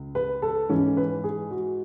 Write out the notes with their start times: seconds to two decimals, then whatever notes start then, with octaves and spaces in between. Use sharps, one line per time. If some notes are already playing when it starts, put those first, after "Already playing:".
Already playing: C#2
0.15 B4
0.42 A4
0.69 G#2 E3 C#4
0.97 B4
1.24 G#4
1.51 F#4